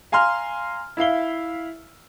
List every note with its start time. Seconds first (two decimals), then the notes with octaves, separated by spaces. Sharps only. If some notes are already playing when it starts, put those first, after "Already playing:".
0.12 F5 G#5 A#5 C6 F6
0.97 E4 E5 F5 G7